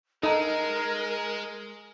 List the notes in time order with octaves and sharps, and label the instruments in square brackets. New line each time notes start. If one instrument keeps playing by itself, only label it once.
[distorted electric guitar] G#3 [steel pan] D#4 A4 [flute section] A#4 [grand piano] D#5 A#5